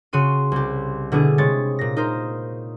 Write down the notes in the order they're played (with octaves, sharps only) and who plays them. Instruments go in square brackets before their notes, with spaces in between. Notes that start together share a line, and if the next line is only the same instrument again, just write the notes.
[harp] C#3 F#4 C6 D#7
C2 G4
B2 D3 D4 E4 G#4
C3 G#3 C#5 A6
A#2 A#6
D#4 A#4 C5